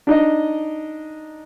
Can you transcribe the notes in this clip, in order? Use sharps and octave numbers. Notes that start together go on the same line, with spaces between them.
D4 D#4 D#5